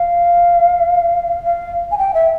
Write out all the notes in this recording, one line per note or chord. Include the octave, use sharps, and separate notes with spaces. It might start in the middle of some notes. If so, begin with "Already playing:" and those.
Already playing: F5
F5
G#5
G5
E5